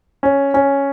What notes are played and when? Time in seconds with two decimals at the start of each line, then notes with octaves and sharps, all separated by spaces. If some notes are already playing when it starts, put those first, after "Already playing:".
0.23 C#4
0.54 C#4